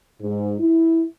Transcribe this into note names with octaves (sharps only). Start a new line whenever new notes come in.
G#2
E4